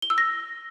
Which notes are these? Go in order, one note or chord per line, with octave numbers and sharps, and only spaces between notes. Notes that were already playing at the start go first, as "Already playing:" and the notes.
G7
E6
A#6